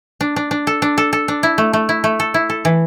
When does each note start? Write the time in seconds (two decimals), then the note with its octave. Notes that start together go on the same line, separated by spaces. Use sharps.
0.21 D4
0.36 D4
0.51 D4
0.67 A4
0.82 D4
0.98 A4
1.13 A4
1.28 D4
1.43 E4
1.58 A3
1.73 A3
1.89 E4
2.04 A3
2.20 A4
2.34 E4
2.50 A4
2.65 E3